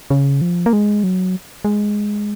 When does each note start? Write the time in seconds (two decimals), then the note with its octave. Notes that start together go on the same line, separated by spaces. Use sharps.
0.10 C#3
0.41 F3
0.66 A#3
0.73 G#3
1.04 F#3
1.65 G#3